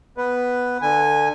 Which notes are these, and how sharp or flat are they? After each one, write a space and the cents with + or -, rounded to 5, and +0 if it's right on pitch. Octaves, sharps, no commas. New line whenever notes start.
B3 +0 B4 +0
D3 +20 G#5 -10